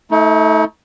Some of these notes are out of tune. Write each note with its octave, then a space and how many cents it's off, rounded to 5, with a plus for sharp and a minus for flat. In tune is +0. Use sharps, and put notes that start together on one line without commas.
A3 +0 D#4 +45